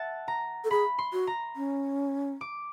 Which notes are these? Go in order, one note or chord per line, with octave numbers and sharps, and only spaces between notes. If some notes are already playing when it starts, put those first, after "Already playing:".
Already playing: E5 F#5 A5
A#5
A4
G#4 B5
C6
F#4
A#5
C#4
D6